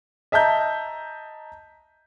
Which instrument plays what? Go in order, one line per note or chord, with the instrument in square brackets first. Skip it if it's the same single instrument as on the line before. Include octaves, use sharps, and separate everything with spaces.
[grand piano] D#5 E5 A5 A#5 G6